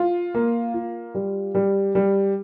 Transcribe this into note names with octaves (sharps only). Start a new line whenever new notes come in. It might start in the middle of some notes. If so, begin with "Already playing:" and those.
Already playing: F4
A#3
F4
G3
G3
G3